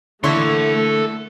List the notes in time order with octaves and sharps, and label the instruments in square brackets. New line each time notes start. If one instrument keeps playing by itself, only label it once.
[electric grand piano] D3 [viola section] A3 [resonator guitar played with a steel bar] A#3 E4 C#5 [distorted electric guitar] A4 C6